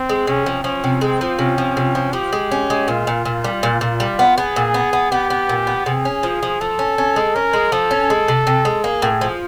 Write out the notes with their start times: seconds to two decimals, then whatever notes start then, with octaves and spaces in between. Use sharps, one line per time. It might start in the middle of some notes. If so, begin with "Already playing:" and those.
Already playing: C4
0.09 G#3
0.27 C3 C#4
0.46 F3
0.64 F3 C#4
0.84 C3
1.01 G#3 C4
1.21 F3
1.39 C3 C#4
1.58 F3
1.77 C3
1.95 F3
2.13 F3 G4
2.33 G#3
2.51 C#4
2.70 G#3
2.88 A#2 F4
3.07 A#2
3.25 A#2
3.44 G3
3.63 A#2
3.81 A#2
4.00 G3
4.19 B3
4.38 B3 G#4
4.56 A#2
4.74 B3
4.93 B3
5.11 B3 G4
5.30 B3
5.49 A#2
5.67 B3
5.86 C3 G#4
6.05 C#4
6.23 F3
6.43 F3
6.61 F3 A4
6.79 C#4
6.98 C#4
7.16 G#3
7.35 C#4 A#4
7.53 G#3
7.72 F3 A4
7.91 C#4
8.10 G#3
8.28 C3
8.47 C3
8.65 G#3
8.84 A#3 G#4
9.02 A2
9.21 F3